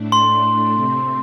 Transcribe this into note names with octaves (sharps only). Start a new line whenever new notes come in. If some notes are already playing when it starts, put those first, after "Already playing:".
Already playing: A2 A3 D4
C6
C3 A3 C4